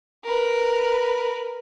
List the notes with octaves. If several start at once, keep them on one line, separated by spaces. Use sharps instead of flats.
A#4 B4